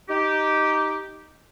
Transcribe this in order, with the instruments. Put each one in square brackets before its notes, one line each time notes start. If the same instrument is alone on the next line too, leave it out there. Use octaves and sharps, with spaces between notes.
[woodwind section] D#4 G4